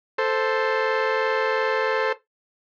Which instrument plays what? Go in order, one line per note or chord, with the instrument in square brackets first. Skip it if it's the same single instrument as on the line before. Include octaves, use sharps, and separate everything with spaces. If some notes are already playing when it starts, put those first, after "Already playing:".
[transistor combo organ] A4 C5